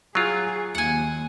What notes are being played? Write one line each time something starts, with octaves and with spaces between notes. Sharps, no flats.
F#3 F4 G#4
D#2 F#5 G#5